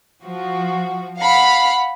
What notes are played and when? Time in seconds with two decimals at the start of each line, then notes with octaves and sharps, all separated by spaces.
0.22 F3 F#4
1.18 F5 F#5 B5